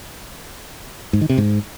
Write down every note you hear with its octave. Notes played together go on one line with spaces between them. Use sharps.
G#2
D#3
C3
G#2